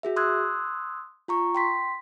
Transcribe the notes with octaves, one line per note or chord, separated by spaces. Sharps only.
F#4 G#4 E5
C6 D#6 E6 F#6 G#6
F4 A#5 C#6
G5 C6 B6